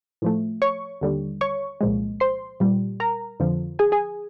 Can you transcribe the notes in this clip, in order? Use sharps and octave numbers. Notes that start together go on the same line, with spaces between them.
A2 F3 A3
C#5 C#6
D#2 D3 G3
C#5 C#6
C2 A#2 F3 G#3
C5 C6
A#2 G3
A#4 A#5
F2 D3 F3
G#4 G#5
G#4 G#5